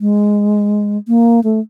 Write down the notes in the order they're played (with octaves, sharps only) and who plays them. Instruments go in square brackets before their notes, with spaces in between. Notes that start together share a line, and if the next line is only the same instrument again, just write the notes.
[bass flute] G#3
A#3
A3